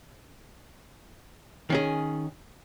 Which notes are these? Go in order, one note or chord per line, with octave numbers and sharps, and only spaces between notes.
D#3 C#4 G#4